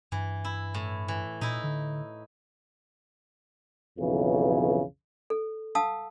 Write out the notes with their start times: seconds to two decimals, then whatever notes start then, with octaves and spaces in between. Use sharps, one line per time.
0.12 G2 E3
0.45 E4
0.74 A2
1.08 E3
1.41 A#2 D#4 E4
1.64 D3
3.99 B1 F2 C#3 E3
5.30 A4
5.75 F5 F#5 A5 D#6 E6